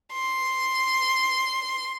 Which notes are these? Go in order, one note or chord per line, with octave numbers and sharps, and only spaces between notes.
C6